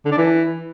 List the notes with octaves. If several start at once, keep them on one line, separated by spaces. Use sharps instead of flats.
D3
D4
E3